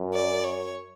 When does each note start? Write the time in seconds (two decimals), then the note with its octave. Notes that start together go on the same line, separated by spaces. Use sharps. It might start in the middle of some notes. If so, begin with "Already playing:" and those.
Already playing: F#2
0.14 D5
0.44 C#5